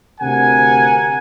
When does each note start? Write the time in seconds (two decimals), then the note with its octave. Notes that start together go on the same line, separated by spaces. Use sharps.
0.20 D2 C3 A#4 F#5 G#5